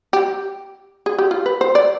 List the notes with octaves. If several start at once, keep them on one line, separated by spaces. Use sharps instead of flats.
G4
G#4
G4
F4
B4
C5
D5